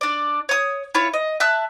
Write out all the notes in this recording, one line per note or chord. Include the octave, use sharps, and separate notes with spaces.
D4 D5
C#5 D#6
E4 F4 C#5
D#5
E5 A5 E6 F#6